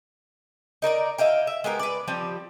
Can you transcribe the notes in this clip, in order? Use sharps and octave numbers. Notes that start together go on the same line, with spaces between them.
D#4 A#4 C5 D5
E4 D#5 F5 G5
E5
G#3 B3 G4 A#4
B4 D5
F3 G3 C4 G4